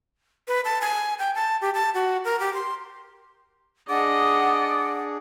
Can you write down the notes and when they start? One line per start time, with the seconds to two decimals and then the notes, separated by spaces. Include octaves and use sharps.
0.48 B4
0.65 A5
0.81 G#5
1.19 G5
1.35 A5
1.62 G4
1.74 A5
1.94 F#4
2.25 A#4
2.40 G4
2.54 C6
3.89 D4 G#4 D5 D#5 F#5